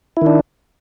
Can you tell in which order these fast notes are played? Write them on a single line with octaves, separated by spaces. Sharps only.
E4 D#3 D4